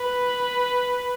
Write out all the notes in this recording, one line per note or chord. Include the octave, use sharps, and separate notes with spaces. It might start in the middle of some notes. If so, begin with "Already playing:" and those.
Already playing: B4